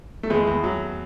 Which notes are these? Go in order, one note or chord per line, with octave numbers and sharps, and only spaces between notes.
A3
E2 G#3
E2
F#3